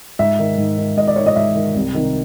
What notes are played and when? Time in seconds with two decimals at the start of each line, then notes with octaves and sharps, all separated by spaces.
0.19 G#2 E5
0.39 D#3
0.58 G#2
0.78 D#3
0.97 G#2 D#5
1.07 D5
1.16 D#3 C#5
1.26 D#5
1.36 G#2 E5
1.55 D#3
1.75 C2
1.94 C3 D#3